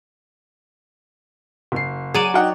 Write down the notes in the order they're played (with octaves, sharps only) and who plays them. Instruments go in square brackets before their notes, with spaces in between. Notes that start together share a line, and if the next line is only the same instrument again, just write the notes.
[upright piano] F#1 C7
[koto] F#3 D5 [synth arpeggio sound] G#4 D#7
[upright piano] D#4 F#5 G5 [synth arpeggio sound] F#4